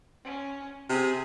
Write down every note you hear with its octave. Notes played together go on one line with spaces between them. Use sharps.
C#4
C3 G#4